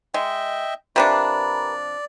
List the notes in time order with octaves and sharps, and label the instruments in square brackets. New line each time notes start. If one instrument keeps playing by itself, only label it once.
[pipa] G#3 [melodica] D#5 E5 G5
[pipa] C3 F3 D4 [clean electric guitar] G4 A#4 B4 [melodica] D5